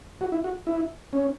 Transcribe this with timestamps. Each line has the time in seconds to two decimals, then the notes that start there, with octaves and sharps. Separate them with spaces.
0.21 F#4
0.32 E4
0.44 F#4
0.67 E4
1.13 C#4